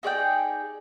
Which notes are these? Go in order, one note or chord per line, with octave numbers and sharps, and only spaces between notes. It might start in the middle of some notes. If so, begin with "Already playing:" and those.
D#4 G#4 D5 G5